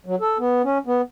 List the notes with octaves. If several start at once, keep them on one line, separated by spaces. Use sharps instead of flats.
F#3
A4
B3
C#4
B3